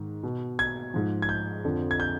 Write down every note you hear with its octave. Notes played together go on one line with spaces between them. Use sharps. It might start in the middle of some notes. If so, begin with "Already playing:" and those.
Already playing: G#2 D#3
B2
G#6
G#2 F3
G#6
G6
F2 D3 F3
G#6
G6